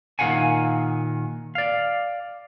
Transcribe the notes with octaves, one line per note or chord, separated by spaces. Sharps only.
A#2 D#3 F4 F5 F#5 G#5
D5 F5